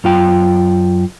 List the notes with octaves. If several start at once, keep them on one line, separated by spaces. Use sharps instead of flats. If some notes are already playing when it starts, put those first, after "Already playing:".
F#2 F4 G5